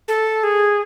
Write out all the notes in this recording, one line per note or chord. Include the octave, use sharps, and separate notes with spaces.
A4
G#4